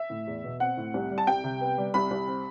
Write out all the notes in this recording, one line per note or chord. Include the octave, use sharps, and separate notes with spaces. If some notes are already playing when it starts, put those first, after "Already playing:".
Already playing: E5
A2
E2
B2
C4 F#5
A2
C2
G3
A5
C2 G5
C3
B3
G3
C2 B5
C2
C4